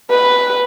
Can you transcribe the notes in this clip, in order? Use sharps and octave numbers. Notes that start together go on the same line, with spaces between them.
B4